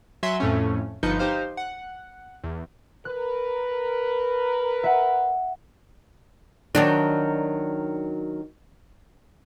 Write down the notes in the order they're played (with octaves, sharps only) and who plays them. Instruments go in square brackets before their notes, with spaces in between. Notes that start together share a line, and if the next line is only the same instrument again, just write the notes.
[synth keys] F#3 E5 G#5 C6
F2 A2 A3 C#4
G1 F3 D#4 B4 G6 C#7
D#4 G4 C5 F5
F#5
E2
[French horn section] A#4 B4 [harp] F#6
[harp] E5 F#5
[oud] D#3 F#3 D4